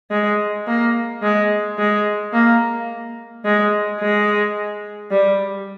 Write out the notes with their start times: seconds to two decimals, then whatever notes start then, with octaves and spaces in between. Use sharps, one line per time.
0.10 G#3
0.67 A#3
1.22 G#3
1.78 G#3
2.33 A#3
3.45 G#3
3.99 G#3
5.11 G3